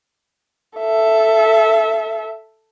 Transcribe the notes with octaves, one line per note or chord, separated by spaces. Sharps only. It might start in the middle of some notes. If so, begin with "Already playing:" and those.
A4 E5